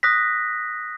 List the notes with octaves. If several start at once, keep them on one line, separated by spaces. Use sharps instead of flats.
D#6 F#6 A#6 B6